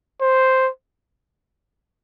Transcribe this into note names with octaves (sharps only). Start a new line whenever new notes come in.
C5